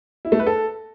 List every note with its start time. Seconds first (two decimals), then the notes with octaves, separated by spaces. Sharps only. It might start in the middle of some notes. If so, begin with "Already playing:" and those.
0.25 E4
0.32 A3
0.39 B4
0.47 A4